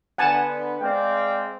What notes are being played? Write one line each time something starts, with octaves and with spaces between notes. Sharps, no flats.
D3 B3 F#5 G#5 A5
G#3 C4 D5 F5 G5